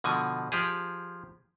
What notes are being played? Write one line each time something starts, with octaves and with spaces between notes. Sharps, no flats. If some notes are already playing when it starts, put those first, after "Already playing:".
B2 D3 F3 G#5
F3 G4 G#4